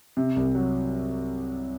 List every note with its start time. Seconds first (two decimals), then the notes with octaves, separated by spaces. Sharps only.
0.17 C3
0.36 C2
0.55 F#3